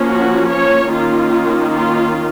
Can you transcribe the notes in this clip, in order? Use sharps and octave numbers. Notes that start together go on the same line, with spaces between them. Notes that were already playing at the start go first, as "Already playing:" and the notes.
Already playing: F3 A#3 C#4
F#4
C#5
D#3 A#3 C#4 F4
F4